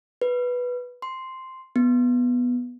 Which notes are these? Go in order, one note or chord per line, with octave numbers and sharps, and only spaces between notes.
B4
C6
B3